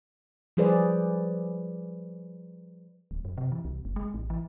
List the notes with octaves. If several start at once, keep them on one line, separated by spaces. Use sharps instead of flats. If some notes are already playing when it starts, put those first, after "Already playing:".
F3 G3 G#4 B4 C5 D5
D1
F#2
C3
E3
C2
F#1
G#3
A1
E3